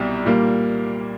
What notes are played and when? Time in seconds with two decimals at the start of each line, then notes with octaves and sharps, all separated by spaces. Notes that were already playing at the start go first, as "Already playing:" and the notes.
Already playing: C2 B2 G3
0.25 A#2 G3 A#3